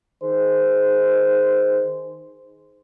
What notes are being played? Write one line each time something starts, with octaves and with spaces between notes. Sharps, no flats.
D#3 G#4 C5